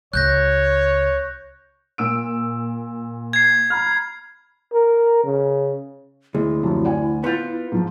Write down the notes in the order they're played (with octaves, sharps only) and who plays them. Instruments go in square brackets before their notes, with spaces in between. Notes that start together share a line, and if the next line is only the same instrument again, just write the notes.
[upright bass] C#2 [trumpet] C#5 [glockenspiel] F#6 G6 A#6
[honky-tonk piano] A#2 E6 D7
[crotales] G#6 C7
[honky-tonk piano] A#5 B5 F6
[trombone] A#4
C#3
[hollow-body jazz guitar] D2 [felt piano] G#3 [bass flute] E4
[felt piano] F#2 C3 F3
D5 F#5 G#5
[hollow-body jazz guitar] B3 F4 [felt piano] C6 G6 A6
[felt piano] G#2 F3